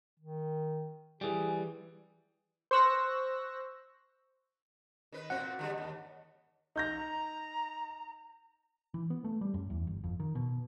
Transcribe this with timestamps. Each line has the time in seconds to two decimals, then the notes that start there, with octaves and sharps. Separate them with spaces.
0.20 D#3
1.21 E3 G3 G#4
2.71 C5 C#6 E6 F#6 A#6
5.12 D#3 B4
5.30 A#2 C4 F#4 F#5
5.59 D3 G3 G#3
5.78 D#2
6.76 D#4 A#5 G6 A#6
8.94 E3
9.10 B3
9.24 A3
9.41 G3
9.54 F#2
9.70 E2
9.87 G1
10.04 F2
10.20 D#3
10.35 B2